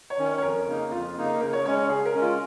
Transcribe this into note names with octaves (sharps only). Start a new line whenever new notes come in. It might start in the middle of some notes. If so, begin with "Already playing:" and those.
C#5
D#3 C#4
C#5
C#5
F2 A#4
C#3 A#3 D#4
F2 F4
C#3 A#3 D#4
C#3 A#4
C#5
G#3 C#4 C#5
C#5
C#3 G#4
A#4
G#3 C#4
F4